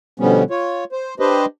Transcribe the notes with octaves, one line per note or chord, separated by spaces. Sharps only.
B2 D3 F3 G3 B3 C#4
F4 C#5
C5
D4 G4 B4 C5 D#5